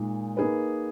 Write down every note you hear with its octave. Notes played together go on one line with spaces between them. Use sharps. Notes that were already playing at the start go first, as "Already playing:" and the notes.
Already playing: A#2 G#3 D#4
A#3 D#4 G#4 B4